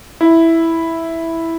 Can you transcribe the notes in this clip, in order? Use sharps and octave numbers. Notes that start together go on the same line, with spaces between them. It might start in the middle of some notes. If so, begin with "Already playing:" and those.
E4